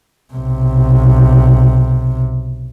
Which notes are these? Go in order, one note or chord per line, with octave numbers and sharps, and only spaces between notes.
B1 C3